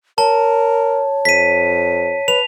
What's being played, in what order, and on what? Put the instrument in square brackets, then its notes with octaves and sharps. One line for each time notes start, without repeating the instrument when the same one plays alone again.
[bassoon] A#4 [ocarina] C#5 [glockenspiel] A5
[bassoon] F2 [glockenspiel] B6 D#7
[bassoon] B4 [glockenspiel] F7